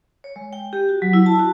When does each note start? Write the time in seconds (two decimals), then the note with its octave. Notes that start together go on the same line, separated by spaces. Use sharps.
0.24 C#5
0.36 G#3
0.53 G5
0.73 G4
0.89 F#4
1.02 F#3
1.13 E4
1.26 A5
1.39 F#4